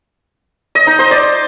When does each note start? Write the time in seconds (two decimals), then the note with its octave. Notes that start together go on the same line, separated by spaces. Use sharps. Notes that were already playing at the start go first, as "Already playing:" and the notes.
0.75 D#5
0.87 D#4
0.99 C5
1.11 D5